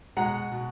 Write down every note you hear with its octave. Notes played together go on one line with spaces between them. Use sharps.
B2 G#3 F#5 A#5
B2